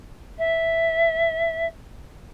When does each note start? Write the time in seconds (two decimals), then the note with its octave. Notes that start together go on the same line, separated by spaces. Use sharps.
0.38 E5